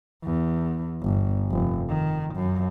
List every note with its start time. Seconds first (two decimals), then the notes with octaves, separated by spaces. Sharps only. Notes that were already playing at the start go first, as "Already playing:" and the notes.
0.24 E2
1.03 G1
1.50 F1
1.89 D#3
2.35 F#2